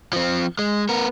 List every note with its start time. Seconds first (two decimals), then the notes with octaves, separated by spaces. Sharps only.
0.13 F3 C4
0.59 G#3
0.89 B3 A#4